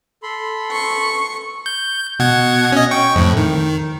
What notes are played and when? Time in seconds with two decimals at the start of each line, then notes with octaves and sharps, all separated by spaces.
0.23 A4 B5 C6
0.72 C#6
1.66 G6
2.19 B2 F#5 G#6
2.72 C#4 D#5
2.91 G5 C#6
3.15 F2 A2
3.37 D#3